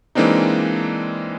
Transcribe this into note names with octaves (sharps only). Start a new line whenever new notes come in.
E3 G#3 A#3 C4 D4 D#4